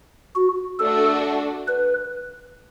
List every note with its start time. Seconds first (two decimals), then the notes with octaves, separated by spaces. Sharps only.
0.35 F#4
0.79 A3 D4 F#4 A4
1.68 B4